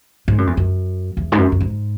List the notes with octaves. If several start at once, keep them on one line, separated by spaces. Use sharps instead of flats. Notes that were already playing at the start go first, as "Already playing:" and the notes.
G#2
F#2
E2
F#2
E2
G#2
F#2
F#2
G#2